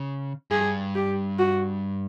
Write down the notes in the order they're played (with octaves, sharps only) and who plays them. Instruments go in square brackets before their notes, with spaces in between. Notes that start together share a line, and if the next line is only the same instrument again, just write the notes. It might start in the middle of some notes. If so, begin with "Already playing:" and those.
Already playing: [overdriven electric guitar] C#3
[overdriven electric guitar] G2 [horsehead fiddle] G#4
[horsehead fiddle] G4
F#4